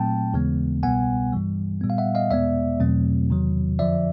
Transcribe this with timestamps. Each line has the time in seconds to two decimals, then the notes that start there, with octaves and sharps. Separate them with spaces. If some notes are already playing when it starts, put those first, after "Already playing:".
Already playing: A#2 F#3 A3 C4 G5 A5
0.34 D#2 C#3 E3 G#3 B3
0.83 C2 B2 G3 B3 F#5 G#5
1.33 G2 E3 G3
1.81 A#2 G3 B3
1.90 F5
1.98 E5 F#5
2.15 D#5 F5
2.31 E2 B2 G#3 B3 D5 E5
2.80 E2 B2 F#3 A3 C4
3.30 E2 C3 D#3 F#3
3.79 F2 D3 F3 D5 E5